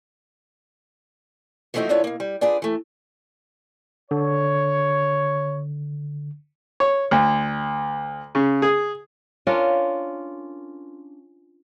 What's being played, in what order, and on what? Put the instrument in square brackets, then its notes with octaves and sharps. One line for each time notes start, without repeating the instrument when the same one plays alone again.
[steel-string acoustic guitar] E3 F3 A3 C4 D#4 F#4
D2 D4 F4 A4 C#5 E5
B2 A#3
G3
D4 F4 G#4 B4 D5
E3 A3
[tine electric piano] D3 [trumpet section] C#5
[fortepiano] C#5
D2
C#3
G#4
[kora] C#4 D4 F4 A#4